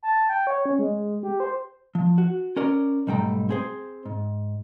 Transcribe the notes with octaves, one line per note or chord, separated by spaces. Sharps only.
A5
G5
C#5
C#4
G#3
G4
C5
F3
F#4
C#4 A#4 D5
B1 G#2 G3 A3 G5 A#5
C4 G#4 C5
G#2